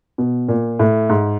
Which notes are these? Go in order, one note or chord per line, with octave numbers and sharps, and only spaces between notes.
B2
A#2
A2
G#2